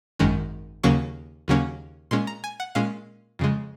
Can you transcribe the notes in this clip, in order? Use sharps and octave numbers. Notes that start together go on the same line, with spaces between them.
G#1 F#2 D#3 G#3 C#4
D#2 C#3 F#3 A#3 C#4 C#6
D#2 C#3 F#3 A#3 C#4
A#2 G#3 C#4 C6
A#5
G#5
F#5
A#2 G#3 C#4 F5
F2 C#3 G#3